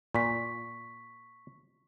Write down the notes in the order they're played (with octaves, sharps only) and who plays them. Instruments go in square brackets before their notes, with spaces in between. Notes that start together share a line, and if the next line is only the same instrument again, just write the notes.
[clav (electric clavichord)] A#2 [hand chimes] C#6 B6